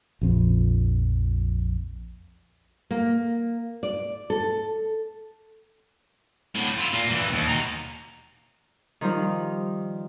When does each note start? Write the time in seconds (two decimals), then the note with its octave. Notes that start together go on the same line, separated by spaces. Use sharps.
0.21 A#1 F2
2.91 A#3
3.83 D5
4.30 A4
6.55 A2 D3
6.78 E4 F4
6.93 A#2 A#3
7.09 G2 E3
7.32 D#2
7.48 B2 A#5
9.01 D#3 F3 G3 F4